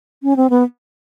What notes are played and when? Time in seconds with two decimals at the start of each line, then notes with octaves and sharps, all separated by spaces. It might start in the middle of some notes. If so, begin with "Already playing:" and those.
0.23 C#4
0.36 C4
0.50 B3